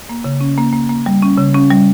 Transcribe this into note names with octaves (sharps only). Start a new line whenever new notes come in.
A#3
C#3
C#4
A#3
A#3
A#3
G3
C#4
C#3
C#4
G3